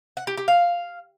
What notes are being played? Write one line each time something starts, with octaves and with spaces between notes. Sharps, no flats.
F#5
G4
G4
F5